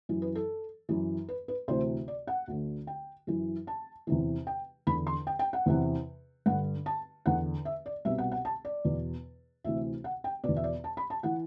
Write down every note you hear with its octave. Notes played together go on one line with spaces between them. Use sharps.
F#2 E3
B4
A4
F#2 E3
B4
B4
D2 C3 E3 C5
D5
F#5
D2 D3
G5
F#2 E3
A5
E2 C3 E3
G5
E2 D3 B5
C6
G5
G5
F#5
E2 C3 E3
G2 D3 F#5
A5
E2 D3 F#5
E5
D5
C2 B2 E5
F#5
F#5
A5
D5
E2 B2
D2 C3 E3 E5
F#5
G5
E2 B2 D5
E5
D5
A5
B5
A5
E3 F#5